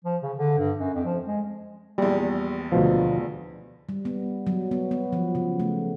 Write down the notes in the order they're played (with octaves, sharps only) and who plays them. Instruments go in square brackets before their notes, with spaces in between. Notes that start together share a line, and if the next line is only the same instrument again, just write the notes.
[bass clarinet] F3
C#3
D3
G2
F#2
F2
F3
G#3
[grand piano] A#1 E2 [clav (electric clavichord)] G3
[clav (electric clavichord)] D2 B2 F3
[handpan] G3
B3
F#3
B3
B3
F3
C#3
A3